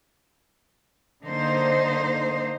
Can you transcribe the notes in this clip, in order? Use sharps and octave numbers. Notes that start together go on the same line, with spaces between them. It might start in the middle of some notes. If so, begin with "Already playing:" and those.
D3 A#3 D#4 C5